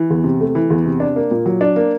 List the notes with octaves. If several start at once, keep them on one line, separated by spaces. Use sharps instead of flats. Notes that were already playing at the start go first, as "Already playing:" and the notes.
Already playing: E3
E2
C3
A3
E3
E2
C3
D4
A#3
A#2
F#3
D4
A#3